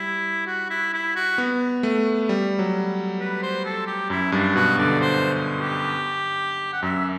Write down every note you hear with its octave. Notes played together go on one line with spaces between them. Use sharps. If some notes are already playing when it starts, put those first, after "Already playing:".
Already playing: G3 E4
F#4
E4
E4
F#4
B3
A3
G3
F#3
B4
C5
A4
G4
F#2 E4
G2 D4
B2 F#4
D3 D5
C5
G4
F#5
F#2 E5